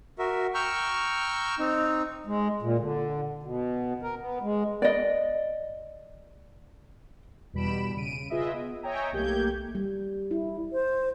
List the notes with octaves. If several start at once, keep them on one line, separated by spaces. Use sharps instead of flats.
F#4 A#4 E5
G5 A#5 C#6 E6 F6 G6
C4 D#4
G#3
A#2
D3
B2
A#4
B3
G#3
D5 D#5
E2 B2 G3 B5 D7 E7
C#3 D7 D#7
F4 G#4 B4 D#5 E5
B3
C#5 D#5 E5 G5 G#5 A#5
B1 A3 A#3 G4 G6 G#6
G3
E4
C5